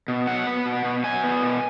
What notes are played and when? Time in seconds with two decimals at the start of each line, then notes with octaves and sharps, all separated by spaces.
0.08 B2
0.27 F#3 F#5
0.47 B3
0.66 B2
0.85 B2
1.04 F#3 G#5
1.23 B3
1.42 B2